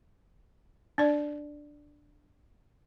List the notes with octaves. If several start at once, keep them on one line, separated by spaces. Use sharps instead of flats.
D4 D5